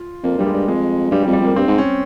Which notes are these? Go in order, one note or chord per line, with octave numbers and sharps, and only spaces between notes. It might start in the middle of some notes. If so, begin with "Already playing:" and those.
Already playing: F4
F2 A#3
G2 G3
G#3
G2
F2 G#3
G2 G3
G3
F2
G3
F2 A#3
G2 C4
G#2
C#4